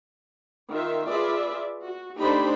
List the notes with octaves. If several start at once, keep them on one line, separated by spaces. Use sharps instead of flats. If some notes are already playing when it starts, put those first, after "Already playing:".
D#3 F4 E5
F4 G#4 B4 D5 E5
F#4
A3 D4 D#4 G4 C5 B5